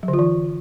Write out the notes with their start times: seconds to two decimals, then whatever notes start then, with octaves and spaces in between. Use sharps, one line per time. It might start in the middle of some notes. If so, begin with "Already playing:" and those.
0.03 F#3
0.08 D3
0.14 F4
0.19 E3